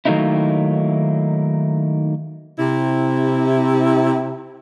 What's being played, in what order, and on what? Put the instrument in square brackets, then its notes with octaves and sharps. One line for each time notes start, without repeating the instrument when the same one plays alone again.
[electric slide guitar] D#3 F#3 A3 A#3 D#4 E4
[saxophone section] C3 E4